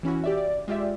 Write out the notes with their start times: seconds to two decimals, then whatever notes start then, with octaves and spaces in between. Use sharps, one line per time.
0.03 E3 C#4 E4 F#4
0.24 G4 D5 E5
0.37 D5
0.68 G#3 F4 G4 D5 E5